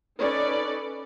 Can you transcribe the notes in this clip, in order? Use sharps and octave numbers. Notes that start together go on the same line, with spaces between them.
C#4 D#4 A4 B4 D5